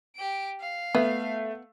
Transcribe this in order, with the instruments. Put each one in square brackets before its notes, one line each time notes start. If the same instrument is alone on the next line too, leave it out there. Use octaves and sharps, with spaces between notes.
[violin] G4 D7
F5
[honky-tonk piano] A3 [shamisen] B3